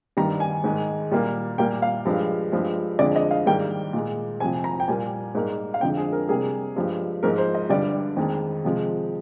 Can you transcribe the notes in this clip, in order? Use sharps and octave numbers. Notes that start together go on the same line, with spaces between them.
G2 D#3 G3 A#5
G#5
G#2 D#3 G#3
A#2 G3 A#3
A#2 G3 A#3 G5
F5
G2 F3 G#3
G2 F3 G#3
F2 D3 F3 G#3 D5
D#5
F5
G#2 D#3 G3 A#3 G5
A#2 G#3
F2 C3 F3 G#5
A#5
G5
A#2 G3 A#3 G#5
G#2 G3 A#3
F5
F2 D3 F3 G#3 G5
G#4
A#4
C3 G3 A#3 G#4
G2 F3 G#3
G#2 F3 G#3 A#4
C5
D#5
G2 D3 G3 D5
F2 D#3 G#3
C3 F3 G#3